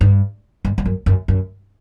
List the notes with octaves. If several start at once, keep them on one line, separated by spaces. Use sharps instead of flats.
G2
G2
G2
F#2
F#2
F#2